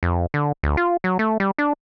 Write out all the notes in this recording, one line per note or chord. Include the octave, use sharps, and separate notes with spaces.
F2
D3
D2
F4
F#3
A3
G3
D4